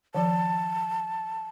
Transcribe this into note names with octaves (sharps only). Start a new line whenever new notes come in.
D#3 F3 A5